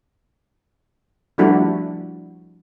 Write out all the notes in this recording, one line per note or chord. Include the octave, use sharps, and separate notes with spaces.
F3 G3 A3 D4 E4 F#4